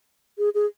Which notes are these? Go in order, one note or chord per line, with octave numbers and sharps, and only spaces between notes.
G#4
G#4